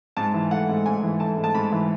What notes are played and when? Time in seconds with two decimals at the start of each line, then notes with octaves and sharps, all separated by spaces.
0.17 G#2 A5
0.34 E3
0.51 A3 F#5
0.69 G#2
0.86 G#2 G#5
1.03 E3
1.20 A3 A5
1.37 G#2
1.44 A5
1.55 G#2 B5
1.72 E3